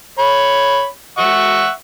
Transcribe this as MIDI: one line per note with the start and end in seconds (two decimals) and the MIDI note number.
0.19 0.86 73
0.19 0.86 83
1.18 1.71 76
1.18 1.71 78
1.18 1.71 85